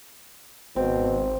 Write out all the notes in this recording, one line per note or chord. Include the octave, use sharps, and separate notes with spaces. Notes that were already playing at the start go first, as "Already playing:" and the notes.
G#1 B2 C4